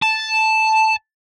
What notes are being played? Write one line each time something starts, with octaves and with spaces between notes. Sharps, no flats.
A5